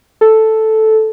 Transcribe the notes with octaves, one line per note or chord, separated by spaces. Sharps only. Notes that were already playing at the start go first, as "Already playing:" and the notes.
A4